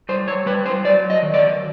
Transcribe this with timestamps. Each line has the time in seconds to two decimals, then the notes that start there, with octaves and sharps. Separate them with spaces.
0.09 G3 C5
0.28 C#5
0.46 G3 B4
0.66 C5
0.85 F#3 D5
1.10 D#5
1.22 D#3
1.34 D5